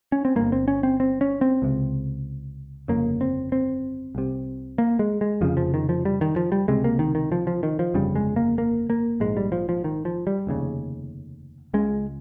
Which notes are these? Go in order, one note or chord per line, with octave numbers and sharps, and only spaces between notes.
C#4
C4
G1 G2 A#3
C4
C#4
C4
C4
C#4
C4
C#2 C3
G1 F2 C#3 A#3
C4
C4
C2 C3
A#3
G#3
G#3
F1 F2 C#3 F3
F3
D#3
F3
G3
D#3
F3
G3
C#2 C3 G#3
A#3
D#3
D#3
F3
F3
D#3
F3
G1 F2 C#3 G3
G#3
A#3
A#3
A#3
A#1 G#2 G#3
G3
F3
F3
D#3
F3
G3
F1 D#2 C#3
C#2 C#3 G#3